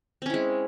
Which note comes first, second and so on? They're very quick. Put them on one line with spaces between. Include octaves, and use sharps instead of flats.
C4 C#4 E4 G#3